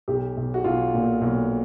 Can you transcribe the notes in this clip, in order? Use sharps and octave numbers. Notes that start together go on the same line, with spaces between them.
B1 G4
B1
F#4
B1 F4
A#2
B1